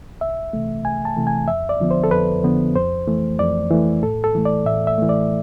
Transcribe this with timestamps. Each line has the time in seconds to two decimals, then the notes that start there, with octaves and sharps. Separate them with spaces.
0.21 C2 E5
0.53 C3 E3 A3
0.84 C2 G#5
1.05 A5
1.17 C3 E3 A3
1.27 G#5
1.48 F2 E5
1.69 D5
1.80 D3 F3 B3
1.91 C5
2.04 A4
2.11 F2 B4
2.43 D3 F3 B3
2.75 F2 C5
3.08 E3 A3
3.39 F2 D5
3.71 E3 A3
4.03 A2 A4
4.24 A4
4.35 E3 A3
4.45 D5
4.66 A2 E5
4.87 E5
4.98 E3 A3
5.09 D5